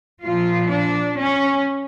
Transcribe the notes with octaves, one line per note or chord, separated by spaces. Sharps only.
A#2 F3 F4
D4
C#4